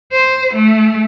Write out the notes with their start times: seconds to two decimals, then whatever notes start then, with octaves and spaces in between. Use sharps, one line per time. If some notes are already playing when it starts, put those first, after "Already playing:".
0.13 C5
0.55 A3